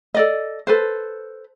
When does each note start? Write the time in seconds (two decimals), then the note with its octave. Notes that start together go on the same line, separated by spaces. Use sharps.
0.14 A4 D5 D#5
0.67 A4 B4 C5